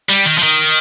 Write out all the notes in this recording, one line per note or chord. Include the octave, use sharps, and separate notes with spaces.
G3
D#3
F3
D#3